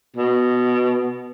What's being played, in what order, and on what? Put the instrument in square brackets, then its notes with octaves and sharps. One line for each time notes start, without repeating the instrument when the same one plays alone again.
[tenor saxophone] B2